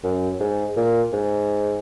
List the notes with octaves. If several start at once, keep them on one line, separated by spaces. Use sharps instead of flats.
F#2
G#2
A#2
G#2